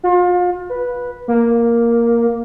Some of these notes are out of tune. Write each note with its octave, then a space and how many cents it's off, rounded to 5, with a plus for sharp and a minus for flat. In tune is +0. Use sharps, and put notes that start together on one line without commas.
F4 +35
B4 -10
A#3 +5